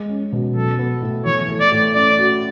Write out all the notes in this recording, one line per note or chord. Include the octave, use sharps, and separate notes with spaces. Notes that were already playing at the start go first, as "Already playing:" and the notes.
Already playing: G#3
C#4
B2
F#3 A4
B3
A2
E3 C#5
A3
D5
A2
C#4 D5
F#4